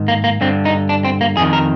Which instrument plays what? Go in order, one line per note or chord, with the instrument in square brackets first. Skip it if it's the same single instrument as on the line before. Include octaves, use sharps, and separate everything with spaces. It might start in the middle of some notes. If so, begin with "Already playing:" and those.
Already playing: [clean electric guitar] G#2 D#3
A#3
A#3
G2 D3 C4
D#4
D4
C4
A#3
F2 D#3 G#4
A#4